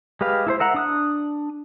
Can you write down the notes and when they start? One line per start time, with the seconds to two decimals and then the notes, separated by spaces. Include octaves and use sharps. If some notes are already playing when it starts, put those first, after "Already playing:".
0.21 G#3 G4 B4 F5
0.47 E4 A4 C5
0.60 A#4 E5 F#5 A#5
0.74 D4 D#6 F#6